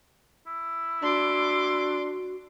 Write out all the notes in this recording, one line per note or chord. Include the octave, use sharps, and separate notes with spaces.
E4
D4 F#4 C6 D6